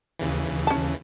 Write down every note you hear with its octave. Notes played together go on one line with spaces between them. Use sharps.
D#2 C#3 E3
C#4 A5